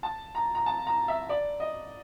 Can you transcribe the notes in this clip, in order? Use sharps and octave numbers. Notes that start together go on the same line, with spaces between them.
A5
A#5
A#5
A5
A#5
E5
D5
D#5